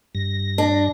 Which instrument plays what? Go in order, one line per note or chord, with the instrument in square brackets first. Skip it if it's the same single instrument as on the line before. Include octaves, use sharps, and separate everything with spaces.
[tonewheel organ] G2 A#6
[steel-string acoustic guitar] D4